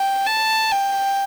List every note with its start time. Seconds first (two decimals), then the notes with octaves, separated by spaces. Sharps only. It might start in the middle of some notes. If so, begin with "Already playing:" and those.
Already playing: G5
0.26 A5
0.72 G5